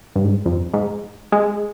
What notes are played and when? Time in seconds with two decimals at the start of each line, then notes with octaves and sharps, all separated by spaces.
0.16 G2
0.24 G#2
0.31 G2
0.46 F2
0.74 G#2
1.32 G#3